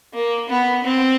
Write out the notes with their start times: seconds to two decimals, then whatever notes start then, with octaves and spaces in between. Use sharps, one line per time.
0.13 A#3
0.48 B3
0.84 C4